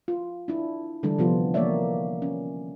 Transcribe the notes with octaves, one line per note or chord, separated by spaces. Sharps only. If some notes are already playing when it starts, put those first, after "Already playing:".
F4
D4 E4
D3 E3 G3 D4 A4
C3 F3 B3 F4
E3 A#3 C#5 D5 E5
C#4